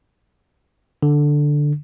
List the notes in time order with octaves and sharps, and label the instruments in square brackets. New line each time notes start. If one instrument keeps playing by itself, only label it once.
[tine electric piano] D3